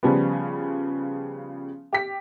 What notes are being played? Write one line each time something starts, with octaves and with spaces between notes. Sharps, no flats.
C#3 F3 G3 B3
G4 B6